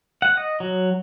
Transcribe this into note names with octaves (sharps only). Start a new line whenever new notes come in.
F#5
D#5
F#3